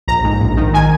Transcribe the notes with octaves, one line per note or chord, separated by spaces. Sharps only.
A#1 A#5
G#2
A#1
D#3
D#3 G#5